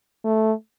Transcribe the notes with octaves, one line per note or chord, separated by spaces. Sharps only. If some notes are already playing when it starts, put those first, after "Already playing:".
A3